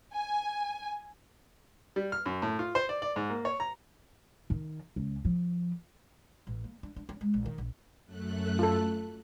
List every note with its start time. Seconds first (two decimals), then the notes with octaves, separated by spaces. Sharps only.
0.13 G#5
1.96 G3
2.12 F6
2.26 F#2
2.42 A2
2.59 F4
2.75 C5
2.89 D5
3.02 D5
3.16 G#2
3.30 A#3
3.45 C#5
3.60 A#5
4.50 D#3
4.96 C#2
5.25 F3
6.47 A1
6.64 A#3
6.83 D4
6.96 D4
7.09 C#4
7.21 G#3
7.34 A#1
7.46 D#3
7.58 A#1
8.06 F#2 A3 F#6
8.59 F4 A4